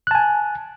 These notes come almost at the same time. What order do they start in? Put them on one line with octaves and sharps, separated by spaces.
F#6 A5 G#5